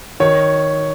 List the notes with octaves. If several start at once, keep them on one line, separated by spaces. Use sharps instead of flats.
D#3 C#5